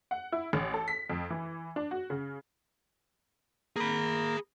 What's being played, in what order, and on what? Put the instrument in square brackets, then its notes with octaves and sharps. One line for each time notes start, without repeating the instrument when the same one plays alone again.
[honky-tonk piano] F#5
E4
A1
A4
B6
F2
E3
D4
F#4
C#3
[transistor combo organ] A#3 [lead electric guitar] G#4 B5